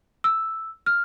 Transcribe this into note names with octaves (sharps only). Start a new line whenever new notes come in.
E6
F6